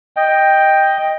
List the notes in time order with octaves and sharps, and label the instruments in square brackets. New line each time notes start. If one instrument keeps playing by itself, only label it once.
[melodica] D#5 G5